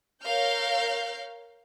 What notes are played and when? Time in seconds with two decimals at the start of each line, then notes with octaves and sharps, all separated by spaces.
0.23 A#4 C#5 F5 F6 G6